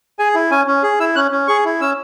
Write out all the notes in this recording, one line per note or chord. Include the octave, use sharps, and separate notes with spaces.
G#4 G#5
E4
C#4 G#5
C#4
G#4
E4 E6
C#4 F#6
C#4
G#4 C#6
E4
C#4 E6